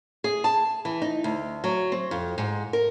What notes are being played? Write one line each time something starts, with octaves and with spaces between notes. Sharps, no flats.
G#4
A5
E3
D#4
D2
F#3
C4
F2
G#2
A#4